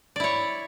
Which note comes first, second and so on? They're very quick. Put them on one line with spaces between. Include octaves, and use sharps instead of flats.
D5 E4 C#5